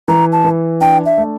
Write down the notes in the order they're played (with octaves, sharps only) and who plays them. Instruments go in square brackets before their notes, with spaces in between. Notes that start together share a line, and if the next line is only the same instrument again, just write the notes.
[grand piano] E3 [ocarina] A#5
[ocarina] A5
[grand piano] E3
[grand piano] D4 [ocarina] G5
[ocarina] E5
[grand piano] A3